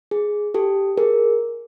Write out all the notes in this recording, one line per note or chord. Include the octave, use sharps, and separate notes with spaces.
G#4
G4 A4
G#4 A#4